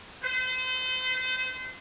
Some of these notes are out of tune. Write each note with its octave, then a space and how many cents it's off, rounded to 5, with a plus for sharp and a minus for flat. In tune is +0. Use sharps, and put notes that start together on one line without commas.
C5 -35